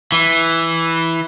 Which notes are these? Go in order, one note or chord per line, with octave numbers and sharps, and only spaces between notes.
E3